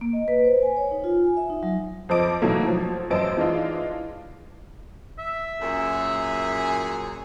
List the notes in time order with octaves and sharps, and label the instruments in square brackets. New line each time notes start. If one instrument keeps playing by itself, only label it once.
[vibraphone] A#3
D#5
B4
C5
G#5
C#5
D#4
F4
G#5
E5
D#4
F#3
[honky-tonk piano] F2 F3 C4 D#5 D6 D7
B2 D#3 E3 F#3 A3 A#3
F3 F#3
A1 F#2 C5 D#5 A5 D7
E3 G#3 D4 D#4 F4
[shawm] E5
[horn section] F#2 A#2 G#4